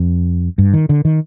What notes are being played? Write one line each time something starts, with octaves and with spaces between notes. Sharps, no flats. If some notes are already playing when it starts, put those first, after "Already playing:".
Already playing: F2
G2
D#3
D3
D#3